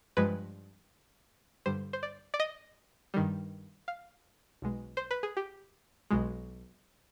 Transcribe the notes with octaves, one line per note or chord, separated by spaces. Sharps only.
G2 F3 G#3 B4
G2 D3 G3 C5
C5
D5
D5
D#5
G2 D#3 G3
F5
B1 B2 G#3
C5
B4
G#4
G4
B1 B2 G#3